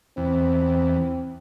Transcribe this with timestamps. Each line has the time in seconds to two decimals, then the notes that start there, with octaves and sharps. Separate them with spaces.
0.17 E2 C4